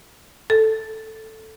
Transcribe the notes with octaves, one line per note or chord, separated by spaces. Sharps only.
A4